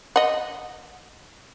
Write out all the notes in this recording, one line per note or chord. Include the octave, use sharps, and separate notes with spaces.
D#5 F#5